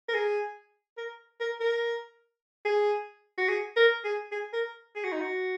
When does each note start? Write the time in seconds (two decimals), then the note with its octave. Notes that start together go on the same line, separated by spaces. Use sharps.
0.09 A#4
0.14 G#4
0.98 A#4
1.40 A#4
1.61 A#4
2.66 G#4
3.38 F#4
3.48 G#4
3.76 A#4
4.05 G#4
4.32 G#4
4.53 A#4
4.95 G#4
5.04 F#4
5.12 D#4
5.21 F#4